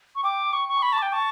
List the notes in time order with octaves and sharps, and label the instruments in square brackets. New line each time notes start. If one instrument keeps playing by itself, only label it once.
[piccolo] C#6
[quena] G5 [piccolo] D6
[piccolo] C#6
C#6
[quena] D6
[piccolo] B5 [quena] C#6
[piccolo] A5
[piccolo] G5 [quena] D6
[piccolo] A5 [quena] C#6